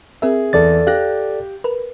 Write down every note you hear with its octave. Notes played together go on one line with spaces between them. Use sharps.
C4 G#4 A#4 E5
E2 A4 D5 A6
G4 F5 F#6 A#6
A#4 B4